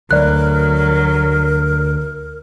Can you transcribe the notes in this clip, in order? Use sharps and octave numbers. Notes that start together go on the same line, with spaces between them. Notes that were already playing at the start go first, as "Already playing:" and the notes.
D2 F#3 A#4 B4 D5 F#6